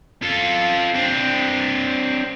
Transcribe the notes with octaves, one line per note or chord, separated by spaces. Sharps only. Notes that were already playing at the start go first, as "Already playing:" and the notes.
F4 A4
C4 D4